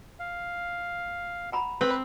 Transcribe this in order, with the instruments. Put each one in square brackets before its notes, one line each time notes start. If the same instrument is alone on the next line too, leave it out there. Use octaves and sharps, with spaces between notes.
[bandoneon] F5
[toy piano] F#5 A#5 B5
[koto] C4 [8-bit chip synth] B4